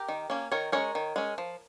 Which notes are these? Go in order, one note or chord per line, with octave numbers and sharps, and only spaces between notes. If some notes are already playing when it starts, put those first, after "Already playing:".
Already playing: G4 A#4
D#3
A#3 C#4
D#3 A#4 C#5
G#3 C#4 A#4 C#5
D#3
G#3 C#4
F3